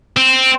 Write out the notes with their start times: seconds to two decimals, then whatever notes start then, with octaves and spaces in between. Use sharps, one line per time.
0.17 C4